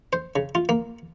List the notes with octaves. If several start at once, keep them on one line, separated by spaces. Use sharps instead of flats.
C5
C#3
F4
A#3